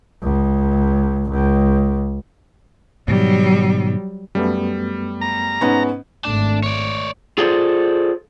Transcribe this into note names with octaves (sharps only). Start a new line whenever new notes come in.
C#2
C#2
G#2 B2 D#3 F#3 G3
F#2 G3 A3 B3
A#5
G#2 B3 C#4
G#1 A3 D4
C#5 D5
F4 G#4 A4 C5 D5